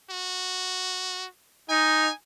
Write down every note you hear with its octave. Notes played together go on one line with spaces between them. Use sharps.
F#4
D#4 G#5